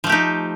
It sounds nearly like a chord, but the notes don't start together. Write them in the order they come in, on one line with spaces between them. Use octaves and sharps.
F3 A3 G4 D#4